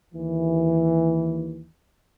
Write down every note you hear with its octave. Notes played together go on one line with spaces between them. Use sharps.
D#2 E3